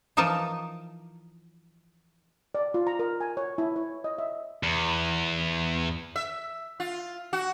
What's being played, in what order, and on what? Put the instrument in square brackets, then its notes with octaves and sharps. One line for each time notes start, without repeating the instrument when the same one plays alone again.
[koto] E3 F3 D#4 A#4 A5
[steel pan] D5
F4
A#5
A#4
G#5
C#5
E4
C#5
D#5
E5
[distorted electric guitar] E2
[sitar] E5
F4
F#4